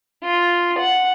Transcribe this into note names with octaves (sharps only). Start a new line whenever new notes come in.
F4
F#5